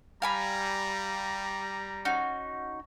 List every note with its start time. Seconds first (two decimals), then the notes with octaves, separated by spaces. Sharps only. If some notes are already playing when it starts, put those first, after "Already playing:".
0.22 G3 F5 G#5 A#5 B5
2.05 C#4 D#4 F#4